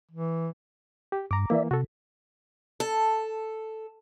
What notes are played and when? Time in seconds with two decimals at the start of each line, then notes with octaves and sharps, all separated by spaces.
0.11 E3
1.12 G4
1.31 G2 A#5 D6
1.50 E3 A#3 D5 E5
1.71 C3 F#4 A4
2.80 A4